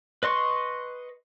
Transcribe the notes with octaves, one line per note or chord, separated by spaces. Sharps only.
B4 D#5 C6 C#6